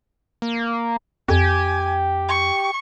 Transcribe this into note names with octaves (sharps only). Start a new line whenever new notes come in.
A#3
F2 G4 G#5
C#6